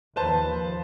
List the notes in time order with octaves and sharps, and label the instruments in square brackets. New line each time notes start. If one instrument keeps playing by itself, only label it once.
[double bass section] D#2 F3 [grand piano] B4 C5 A5